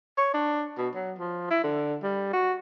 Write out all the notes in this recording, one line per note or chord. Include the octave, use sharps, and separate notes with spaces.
C#5
D4
B2
F#3
F3
E4
D3
G3
F#4